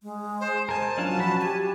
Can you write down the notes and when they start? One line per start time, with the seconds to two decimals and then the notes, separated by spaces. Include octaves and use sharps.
0.03 G#3
0.41 C5
0.69 A#4 C5 G#5 A5
0.98 F#3 C#4 D4 F4
1.17 F3 F#4 B5
1.42 G4 G#5